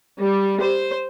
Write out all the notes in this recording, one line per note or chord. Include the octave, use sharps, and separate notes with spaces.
G3
C5